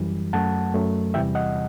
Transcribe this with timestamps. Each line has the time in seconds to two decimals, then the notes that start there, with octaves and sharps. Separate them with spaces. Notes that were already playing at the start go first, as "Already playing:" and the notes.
Already playing: F#2 E3 G3
0.33 F#2 F#3 A3 F#5 A5
0.74 F#2 F#3 A3
1.14 E2 C3 E3 G3 E5 G5
1.35 D#5 F#5